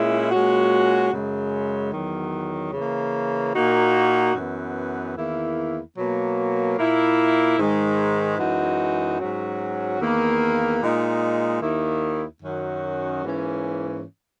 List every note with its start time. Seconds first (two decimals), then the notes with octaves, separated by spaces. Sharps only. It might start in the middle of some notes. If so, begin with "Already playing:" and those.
Already playing: A#2 G#3 C#4 E4
0.31 A#2 G#3 C#4 F#4
1.11 F#2 C#3 G#3
1.93 E2 D#3 F#3
2.73 C#3 E3 A#3
3.55 A#2 A#3 D#4 F#4
4.35 F#2 E3 B3
5.15 E2 D#3 A#3 E4
5.96 B2 F#3 A#3
6.77 A#2 A#3 E4
7.58 G#2 D#3 G#3
8.38 F#2 E3 G#3 D#4 F#4
9.19 G#2 F#3 C#4 F#4
10.00 E2 D#3 A#3 E4
10.80 A#2 G#3 D#4
11.61 D#2 D#3 A#3 E4
12.42 F#2 D#3 F#3 C#4 F#4
13.23 G#2 E3 A#3 C#4